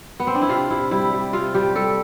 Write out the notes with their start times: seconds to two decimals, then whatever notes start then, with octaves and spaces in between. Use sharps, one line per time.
0.20 B3
0.27 C4
0.35 D4
0.42 E4
0.49 C3 F4
0.70 C3 E4
0.91 G3 E4
1.13 G3
1.33 C3 F4
1.54 G3 G4
1.75 G3 A4